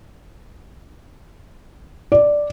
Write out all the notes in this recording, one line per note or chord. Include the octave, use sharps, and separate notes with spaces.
D5